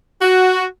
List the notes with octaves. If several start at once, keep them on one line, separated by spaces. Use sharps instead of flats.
F#4